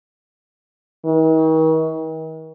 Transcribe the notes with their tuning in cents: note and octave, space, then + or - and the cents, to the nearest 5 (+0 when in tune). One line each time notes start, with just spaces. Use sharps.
D#3 +45